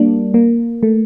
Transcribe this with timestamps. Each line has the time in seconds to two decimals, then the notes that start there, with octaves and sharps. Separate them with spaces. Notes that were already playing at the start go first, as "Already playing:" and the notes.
Already playing: G3 A#3 D4
0.34 A#3
0.83 A3